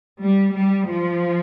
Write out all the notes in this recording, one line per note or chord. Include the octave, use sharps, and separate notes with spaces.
G3
G3
F3